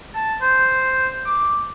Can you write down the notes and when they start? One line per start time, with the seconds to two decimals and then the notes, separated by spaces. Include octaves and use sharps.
0.14 A5
0.41 C5
1.26 D6